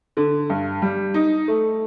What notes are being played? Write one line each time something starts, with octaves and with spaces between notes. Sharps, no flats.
D3
G2
G3
D#4
A3